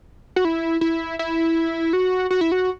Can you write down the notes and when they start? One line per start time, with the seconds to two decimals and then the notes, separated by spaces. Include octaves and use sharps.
0.36 F#4
0.45 E4
0.81 E4
1.19 E4
1.93 F#4
2.31 F#4
2.41 E4
2.52 F#4